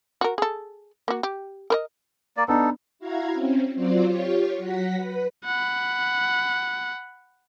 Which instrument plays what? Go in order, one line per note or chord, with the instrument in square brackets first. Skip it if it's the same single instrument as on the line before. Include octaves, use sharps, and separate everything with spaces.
[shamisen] F#4 A#4
G#4 A4
A#3 F#4
G4
A#4 B4 D#5
[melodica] A#3 D5
[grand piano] B3 D4 [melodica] D#4 A4
[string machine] E4 F#4 F5 A#5 G#6
C4 C#4
F#3 C4 F4 C5 D5
F4 G4 C#5 C#6
F#3 F#5 A#6 B6
B4
[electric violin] F#5 B5